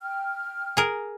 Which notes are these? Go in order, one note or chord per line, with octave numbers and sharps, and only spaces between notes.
G5 F6
G#4 A#4